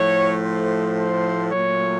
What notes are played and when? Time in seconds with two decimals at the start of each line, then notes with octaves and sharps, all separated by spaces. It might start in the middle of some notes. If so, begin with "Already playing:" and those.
Already playing: A2 F3 A3 C#5
0.45 C5
0.99 C5
1.52 A#2 F#3 A3 C#5